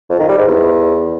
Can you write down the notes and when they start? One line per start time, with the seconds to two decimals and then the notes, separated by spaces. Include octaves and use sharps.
0.10 F2
0.19 D#3
0.29 G3
0.38 G#2
0.48 E2